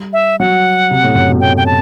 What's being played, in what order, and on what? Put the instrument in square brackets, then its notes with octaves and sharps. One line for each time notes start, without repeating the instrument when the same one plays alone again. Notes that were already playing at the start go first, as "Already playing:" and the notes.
Already playing: [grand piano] G3
[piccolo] E5
[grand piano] F#3 [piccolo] F#5
[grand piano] C3
A2
F#2
B2
[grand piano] A2 [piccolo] G5
[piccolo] G5
A5